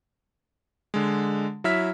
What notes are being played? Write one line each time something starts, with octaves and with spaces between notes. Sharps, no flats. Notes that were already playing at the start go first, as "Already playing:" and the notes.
D3 G#3
F#3 E4 E5 F6 B6